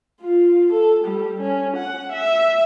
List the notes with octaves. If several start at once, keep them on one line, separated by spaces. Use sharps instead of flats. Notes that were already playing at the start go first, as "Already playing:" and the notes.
F4
A4
G3
C#4
F#5
E5